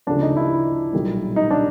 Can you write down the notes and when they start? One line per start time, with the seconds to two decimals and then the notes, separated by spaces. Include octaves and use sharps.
0.07 D2 C#3 F3 D4
0.22 D#4
0.37 E4
0.93 B1 A#2 G3
1.36 D#4
1.51 D4